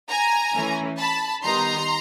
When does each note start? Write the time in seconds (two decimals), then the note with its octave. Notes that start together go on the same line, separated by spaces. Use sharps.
0.09 G#5 A#5
0.54 E3 A3 C#4 E4
0.98 A5 B5
1.43 D#3 G3 B3 D#4 A#5 C6